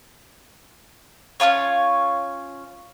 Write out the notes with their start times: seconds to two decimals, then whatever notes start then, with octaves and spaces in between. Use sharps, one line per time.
1.40 C#4 D4 F4 C#5